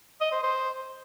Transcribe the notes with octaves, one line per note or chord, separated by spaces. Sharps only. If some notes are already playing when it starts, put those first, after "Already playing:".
D#5
C5
C5